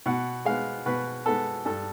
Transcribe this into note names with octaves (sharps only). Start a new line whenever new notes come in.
B2 F#5
G#3 B3 F5
B2 B4
G#3 B3 A4
G2 A4